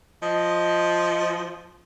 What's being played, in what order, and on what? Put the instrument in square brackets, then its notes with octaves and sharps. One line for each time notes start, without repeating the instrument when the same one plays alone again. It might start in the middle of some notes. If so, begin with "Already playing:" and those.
[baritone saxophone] F3 [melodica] D#5